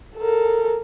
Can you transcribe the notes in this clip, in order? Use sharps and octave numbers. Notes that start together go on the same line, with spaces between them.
A4 A#4